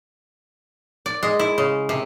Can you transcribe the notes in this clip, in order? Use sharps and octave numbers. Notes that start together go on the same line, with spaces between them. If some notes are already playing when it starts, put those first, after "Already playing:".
D5
G#3
E4
C#3
C3